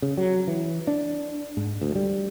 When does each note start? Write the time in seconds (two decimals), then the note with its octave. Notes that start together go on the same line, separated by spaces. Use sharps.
0.02 C#3
0.17 F#3
0.48 E3
0.87 D4
1.57 G#2
1.82 D2
1.95 G3